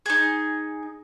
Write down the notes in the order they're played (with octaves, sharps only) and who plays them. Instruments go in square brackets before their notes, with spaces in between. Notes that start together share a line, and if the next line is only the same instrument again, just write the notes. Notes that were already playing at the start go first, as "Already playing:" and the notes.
[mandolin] D#4 G#4